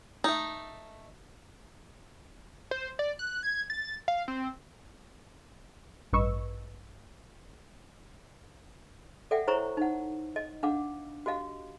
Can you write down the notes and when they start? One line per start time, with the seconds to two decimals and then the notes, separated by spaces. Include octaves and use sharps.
0.24 A3 D#4
2.71 C5
2.99 D5
3.19 F#6
3.43 G#6
3.70 A6
4.08 F5
4.28 C4
6.13 A1 G2 B4 D#5 C#6 E6
9.31 A4 D5 E5 F#5 G5
9.47 E4 C5 C#5 A#5 C#6
9.77 D#4 F#5
10.36 D#5
10.63 D4 F5 F#5 D6
11.26 F#4 G4 D#5 F5